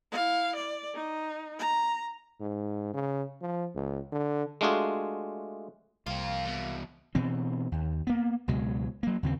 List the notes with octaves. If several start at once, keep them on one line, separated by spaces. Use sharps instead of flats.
E4 F5
D5
D#4
A#5
G#2
C#3
F3
C#2
D3
G#3 A3 D4 F4 F#4 G#4
C2 A#3 C4 F4
E2 B2
B2 E3 C4
D#2
A#3 B3
C#2 B2 F#3 G#3
F#3 A#3
D#2 C#3 A#3 C4